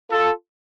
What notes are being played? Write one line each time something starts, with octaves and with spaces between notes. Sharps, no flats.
F4 A4